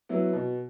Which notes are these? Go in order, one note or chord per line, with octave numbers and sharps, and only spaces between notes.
F#3 B3 E4
B2